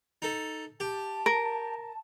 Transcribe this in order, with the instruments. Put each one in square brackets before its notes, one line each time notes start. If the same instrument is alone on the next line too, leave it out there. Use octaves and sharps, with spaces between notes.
[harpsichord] D#4 A4
[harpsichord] G4 [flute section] A5
[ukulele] A#4